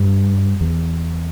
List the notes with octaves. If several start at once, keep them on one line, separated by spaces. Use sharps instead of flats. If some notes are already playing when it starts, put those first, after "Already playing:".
Already playing: G2
E2